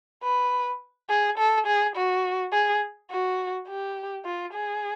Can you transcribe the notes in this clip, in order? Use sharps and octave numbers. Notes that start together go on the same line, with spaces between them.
B4
G#4
A4
G#4
F#4
G#4
F#4
G4
F4
G#4